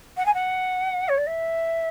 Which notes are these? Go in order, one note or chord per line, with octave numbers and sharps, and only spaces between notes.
F#5
G#5
F#5
C#5
D5
E5